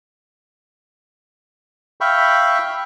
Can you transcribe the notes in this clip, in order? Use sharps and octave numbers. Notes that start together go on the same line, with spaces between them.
E5 F5 G5 B5 C#6